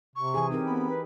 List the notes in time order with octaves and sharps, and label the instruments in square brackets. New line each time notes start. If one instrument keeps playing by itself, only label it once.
[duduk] C3 [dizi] C#6
[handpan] E3 G#4 [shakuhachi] G#5
[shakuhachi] C4 [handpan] D#4 G4 A#4
[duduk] B3 [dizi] B5
[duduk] B4